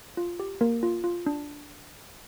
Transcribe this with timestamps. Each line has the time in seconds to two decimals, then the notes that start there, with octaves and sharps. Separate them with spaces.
0.17 F4
0.40 G4
0.61 A#3 A#4
0.83 F4
1.04 F4
1.26 D4